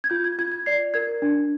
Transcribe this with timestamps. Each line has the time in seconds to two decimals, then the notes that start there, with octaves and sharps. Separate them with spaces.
0.04 G#6
0.10 F4 G6
0.24 G#6
0.39 F4 G#6
0.52 G#6
0.66 D5 C7
0.94 A#4 G#6
1.22 D4